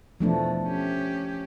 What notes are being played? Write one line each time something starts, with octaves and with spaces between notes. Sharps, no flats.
E2 B2 F3 A3 D4
C#4 G4